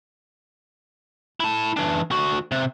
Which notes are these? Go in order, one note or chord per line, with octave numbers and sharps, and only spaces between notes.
E4 A5
E3 D4
D2 F#4
C3